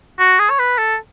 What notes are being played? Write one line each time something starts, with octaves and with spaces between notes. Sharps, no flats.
F#4
G#4
C#5
B4
A4